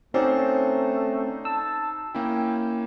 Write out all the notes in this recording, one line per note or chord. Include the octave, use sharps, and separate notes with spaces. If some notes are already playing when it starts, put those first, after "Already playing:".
A3 C4 C#4 D#4 F#4 C5 D5
A5 E6
A#3 C#4 E4 G5